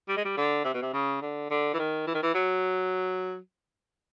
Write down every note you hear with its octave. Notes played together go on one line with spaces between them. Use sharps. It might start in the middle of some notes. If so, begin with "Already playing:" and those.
G3
G#3
G3
D3
C3
B2
C3
C#3
D3
D3
E3
D#3
E3
D#3
E3
F#3